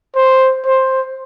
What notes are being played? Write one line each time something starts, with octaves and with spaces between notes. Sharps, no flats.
C5
C5